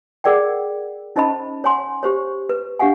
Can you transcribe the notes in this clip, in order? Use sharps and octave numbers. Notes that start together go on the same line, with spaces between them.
G#4 A#4 D5 F#5 G5
C#4 D#4 C5 D#5 A5 B5
C#5 F#5 G#5 C6
G4 C5 C#5
B4
D4 G4 F5 F#5 G#5